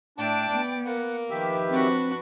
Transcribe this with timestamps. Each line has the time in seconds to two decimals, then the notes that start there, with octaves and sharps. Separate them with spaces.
0.18 A2 D4 D5 E5 G5 A5
0.51 B3
0.86 A#3 F#5
1.30 D#3 F3 G4 B4 E5
1.69 C4 D4 F#4